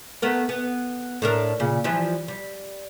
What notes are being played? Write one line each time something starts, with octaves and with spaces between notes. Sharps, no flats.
A3 B3 A#4
B3
A2 D4 A#4
A#2 C#3
E3 F3 G3
G3